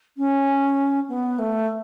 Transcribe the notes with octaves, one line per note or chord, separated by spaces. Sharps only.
C#4
B3
A3